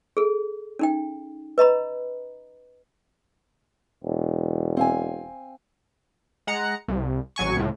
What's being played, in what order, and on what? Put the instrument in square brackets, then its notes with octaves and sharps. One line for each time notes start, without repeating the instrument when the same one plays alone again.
[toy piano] G#4 A4
C#4 D#4 G5
B4 D#5 A#5 B5
[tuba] E1
[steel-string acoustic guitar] C4 F5 G#5
[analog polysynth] G#3 F#5 A#5 C#7
C2
A1 F#3 G#5 C#6
C#2 A2